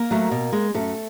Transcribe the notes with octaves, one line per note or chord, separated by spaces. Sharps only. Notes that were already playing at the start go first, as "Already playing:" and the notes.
Already playing: A#3 A#4
F#3 A3
B2
G#3
F#2 A3 A4